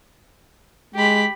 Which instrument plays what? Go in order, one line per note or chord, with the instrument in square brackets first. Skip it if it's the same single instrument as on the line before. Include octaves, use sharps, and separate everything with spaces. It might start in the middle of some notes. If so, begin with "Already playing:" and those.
[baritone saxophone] G#3 [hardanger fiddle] G4 B5